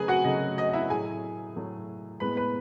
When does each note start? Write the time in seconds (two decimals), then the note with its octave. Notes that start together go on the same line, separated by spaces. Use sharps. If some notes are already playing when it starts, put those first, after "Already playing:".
Already playing: C#3 F#3 A3 G#4 B4 G#5
0.08 F#4 F#5
0.24 C#3 F#3 A3 D#5
0.58 D#5
0.70 D#5
0.73 E4 E5
0.90 A2 F#3 A3 G#4 G#5
1.56 A2 F#3 A3
2.20 A2 G#3 B3 B4 B5
2.37 B4 B5